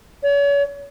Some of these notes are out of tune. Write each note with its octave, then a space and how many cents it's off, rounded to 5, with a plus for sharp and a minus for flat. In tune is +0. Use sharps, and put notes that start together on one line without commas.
C#5 +40